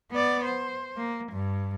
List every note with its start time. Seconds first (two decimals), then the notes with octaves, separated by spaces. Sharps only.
0.11 B3 D5
0.45 C5
0.97 A#3
1.32 G2